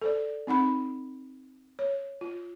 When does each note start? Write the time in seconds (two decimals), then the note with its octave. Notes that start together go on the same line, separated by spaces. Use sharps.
0.02 A4 C5 D5
0.47 C4 D#4 F#5 B5
1.79 C#5
2.21 F4